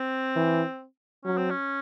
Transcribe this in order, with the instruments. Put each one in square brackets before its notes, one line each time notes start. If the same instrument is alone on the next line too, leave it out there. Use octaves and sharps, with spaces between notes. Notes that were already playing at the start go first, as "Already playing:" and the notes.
Already playing: [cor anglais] C4
[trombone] E3
[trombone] F#3 [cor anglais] C#4
[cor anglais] C4
C#4